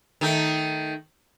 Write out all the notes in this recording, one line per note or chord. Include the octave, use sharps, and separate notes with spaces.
D#3 A3